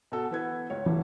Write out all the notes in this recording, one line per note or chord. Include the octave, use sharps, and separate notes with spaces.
B2 A4
E3 B3 G#6
C#2 C#5
E1 E3